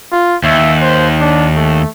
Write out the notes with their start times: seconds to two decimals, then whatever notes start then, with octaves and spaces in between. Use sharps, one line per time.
0.12 F4
0.44 D#2 E5
0.81 C5
1.20 D4
1.55 A3